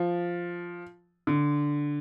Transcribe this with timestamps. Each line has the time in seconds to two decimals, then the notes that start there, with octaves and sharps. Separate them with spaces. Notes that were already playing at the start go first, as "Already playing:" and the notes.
Already playing: F3
1.27 D3